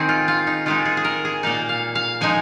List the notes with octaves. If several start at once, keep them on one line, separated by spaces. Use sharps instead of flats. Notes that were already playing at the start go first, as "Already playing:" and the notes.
Already playing: D#3 C4 D#4 G#4
F4
F4
D#4
D#3 G#3 D#4 F4
G#4
G#4
A#4
G#4
A#2 A#3 D#4 F5
F5
F5
F3 G#3 D#4 G#5